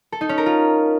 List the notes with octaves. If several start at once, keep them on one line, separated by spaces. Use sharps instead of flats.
A4
D#4
C#4
A#4
F4